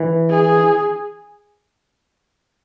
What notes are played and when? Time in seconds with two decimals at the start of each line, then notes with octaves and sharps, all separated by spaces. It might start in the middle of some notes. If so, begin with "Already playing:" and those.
Already playing: E3
0.29 G#4